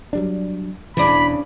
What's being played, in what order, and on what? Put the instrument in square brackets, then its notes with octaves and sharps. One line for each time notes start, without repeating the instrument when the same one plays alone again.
[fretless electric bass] F#3 G3 D4
[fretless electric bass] E1 E3 [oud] C#3 D4 [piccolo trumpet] B5